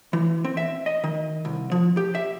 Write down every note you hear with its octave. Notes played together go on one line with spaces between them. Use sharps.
E3
C4
E5
D#5
D#3
C2
F3
G4
E5